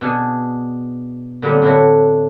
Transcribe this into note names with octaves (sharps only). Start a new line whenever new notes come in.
B2 D4 G#4
A#2 D3 F#3 G3 C4
A2 D3 D4 E4 F#4